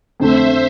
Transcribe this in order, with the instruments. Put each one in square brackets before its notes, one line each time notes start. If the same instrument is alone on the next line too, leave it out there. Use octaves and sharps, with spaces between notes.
[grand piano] F2 D3 A3 [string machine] C5 E5